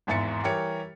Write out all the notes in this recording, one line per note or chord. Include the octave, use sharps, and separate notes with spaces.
G#1 E2 G#2 E5 A6 C#7
E3 G3 G4 A#4 C#5 C#7